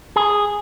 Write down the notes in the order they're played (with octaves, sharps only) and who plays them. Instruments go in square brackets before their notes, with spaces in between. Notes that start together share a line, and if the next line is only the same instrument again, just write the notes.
[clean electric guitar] G#4